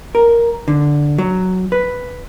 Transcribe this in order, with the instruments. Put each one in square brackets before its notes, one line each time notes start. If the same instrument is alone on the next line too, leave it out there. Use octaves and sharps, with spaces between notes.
[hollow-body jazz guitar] A#4
D3
F#3
B4